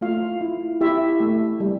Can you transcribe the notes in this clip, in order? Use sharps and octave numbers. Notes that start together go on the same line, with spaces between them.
A3 F4 F5
E4
E4 G4 E5
A3
G3